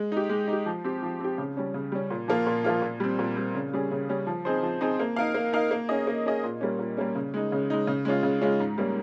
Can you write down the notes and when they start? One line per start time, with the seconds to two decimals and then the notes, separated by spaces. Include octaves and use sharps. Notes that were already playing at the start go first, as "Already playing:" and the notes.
Already playing: G#3
0.12 D#4 G4
0.30 G#3
0.48 D#4
0.53 G4
0.66 F3
0.84 C4 G4
1.03 F3
1.21 C4 G4
1.38 C#3
1.57 G3 C#4
1.74 C#3
1.92 G3 C#4
2.10 A#2
2.28 F3 A#3 F4
2.47 A#2
2.64 F3 A#3 F4
2.82 A#2
3.00 G3 C4
3.19 A#2
3.37 G3 C4
3.55 C#3
3.73 G3 C#4 G#4
3.91 C#3
4.09 G3 C#4 G#4
4.27 F3
4.45 C4 D#4 G#4 C5
4.63 F3
4.81 C4 D#4 G#4 C5
4.99 A#3
5.16 D#4 A#4 F5
5.34 A#3
5.53 D#4 A#4 F5
5.71 A#3
5.89 C#4 G#4 D#5
6.07 A#3
6.26 C#4 G#4 D#5
6.44 A#2
6.61 G3 A#3 C#4
6.79 A#2
6.97 G3 A#3 C#4
7.15 C#3
7.34 G#3 D#4
7.52 C#3
7.70 G#3 D#4
7.87 C#3
8.05 G#3 C#4 F4
8.23 C#3
8.41 G#3 C#4 F4
8.60 G#2
8.78 G3 A#3 C#4